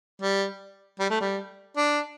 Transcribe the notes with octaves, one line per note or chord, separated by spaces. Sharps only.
G3
G3
A3
G3
D4